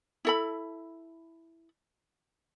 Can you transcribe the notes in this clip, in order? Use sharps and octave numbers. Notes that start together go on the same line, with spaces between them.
E4 A4 B5